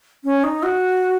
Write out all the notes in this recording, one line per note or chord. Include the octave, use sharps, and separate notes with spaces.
C#4
D#4
F#4